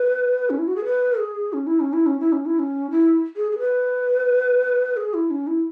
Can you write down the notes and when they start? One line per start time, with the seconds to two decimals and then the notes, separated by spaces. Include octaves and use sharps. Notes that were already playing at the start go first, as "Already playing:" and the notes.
Already playing: B4
0.50 C#4
0.58 E4
0.67 F#4
0.76 G#4
0.85 B4
1.19 G#4
1.53 C#4
1.67 E4
1.80 C#4
1.93 E4
2.06 C#4
2.20 E4
2.32 C#4
2.46 E4
2.59 C#4
2.91 E4
3.36 G#4
3.52 G#4
3.59 B4
4.97 G#4
5.14 E4
5.30 C#4
5.47 E4